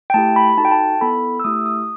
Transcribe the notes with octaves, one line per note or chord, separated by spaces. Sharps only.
G5
A3 E4 G4 A5
B5
D#4 F#4 A4 A5
G5
A5
B3 E4 A4 B5
E6
A3 E4 G4 D#6
D#6